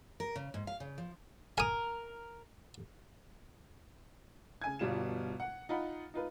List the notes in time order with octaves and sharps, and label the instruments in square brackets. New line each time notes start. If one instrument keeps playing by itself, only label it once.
[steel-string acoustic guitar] A#4
C#3
G#2
F5
C#3
F3
[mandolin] A#4 [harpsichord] G#5 D#6
[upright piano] C#3 G#5 G#6
G1 B2 G3 F4 E7
F#5
D#4 F4 F#5 B5
D#4 F4 B4